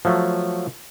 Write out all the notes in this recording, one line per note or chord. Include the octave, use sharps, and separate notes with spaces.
F3 F#3 A3